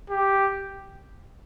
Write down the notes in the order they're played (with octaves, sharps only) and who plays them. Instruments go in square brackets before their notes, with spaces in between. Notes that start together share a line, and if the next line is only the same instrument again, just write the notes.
[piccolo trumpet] G4